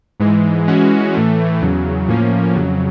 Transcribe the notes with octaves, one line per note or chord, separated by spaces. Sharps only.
G#2 E3 G#3
E3 G#3 C#4 F#4
A2 E3 A3
E2 C#3 F#3
A2 F3 A#3 C#4
F2 C#3 F#3